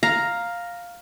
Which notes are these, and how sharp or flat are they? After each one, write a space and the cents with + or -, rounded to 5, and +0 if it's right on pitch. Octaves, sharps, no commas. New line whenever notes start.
F5 +5 A#5 +0